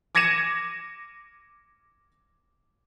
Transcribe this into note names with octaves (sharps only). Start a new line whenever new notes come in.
D6 G#6 A#6 C#7 D#7 E7